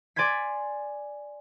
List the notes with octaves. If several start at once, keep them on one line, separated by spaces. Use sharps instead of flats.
D5 G#5 C6 G#6 B6